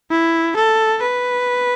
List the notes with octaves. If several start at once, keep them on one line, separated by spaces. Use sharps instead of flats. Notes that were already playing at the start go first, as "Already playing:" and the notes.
E4
A4
B4